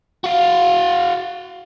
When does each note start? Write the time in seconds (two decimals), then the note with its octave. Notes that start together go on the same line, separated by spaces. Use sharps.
0.24 F#4 F5